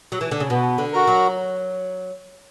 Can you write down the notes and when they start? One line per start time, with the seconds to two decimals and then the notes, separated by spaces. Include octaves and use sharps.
0.12 F#3
0.21 E3
0.31 D3
0.40 C#3
0.50 B2 B3
0.78 D3
0.93 F#4 A#4
1.07 F#3